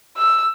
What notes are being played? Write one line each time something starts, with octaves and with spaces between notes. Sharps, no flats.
E6